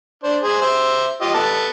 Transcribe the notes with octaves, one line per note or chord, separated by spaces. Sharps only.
D4 C5
G#4 C5
C5 E5
F4 G4 D#5
B3 A4 A5